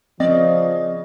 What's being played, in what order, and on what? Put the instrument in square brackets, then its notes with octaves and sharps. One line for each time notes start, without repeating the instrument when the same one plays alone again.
[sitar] C#3 D5 [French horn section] F3 [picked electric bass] C4 [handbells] D#5